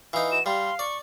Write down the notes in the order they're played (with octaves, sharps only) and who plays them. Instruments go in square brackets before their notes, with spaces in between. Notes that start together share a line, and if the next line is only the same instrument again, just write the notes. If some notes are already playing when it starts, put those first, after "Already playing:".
[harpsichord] E3 D#4 [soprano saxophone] F5
[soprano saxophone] F#4 [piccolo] E7
[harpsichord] G3 [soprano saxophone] F5 [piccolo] C6
[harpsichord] D5 [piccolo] C#6